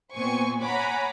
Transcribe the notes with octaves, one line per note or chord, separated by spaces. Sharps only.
A#2 B3 C4 C5 G#5 C#6
C#5 F#5 G#5 A#5 B5 D6